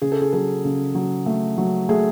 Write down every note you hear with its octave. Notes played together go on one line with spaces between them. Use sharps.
C#3 G#4
A4
G#4
F#3 A4
C#3
F#3
A3
F#3
A3 G#4